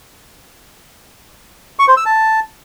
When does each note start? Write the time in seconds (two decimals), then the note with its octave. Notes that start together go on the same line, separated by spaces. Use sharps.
1.79 C#6
1.88 C5
1.97 E6
2.06 A5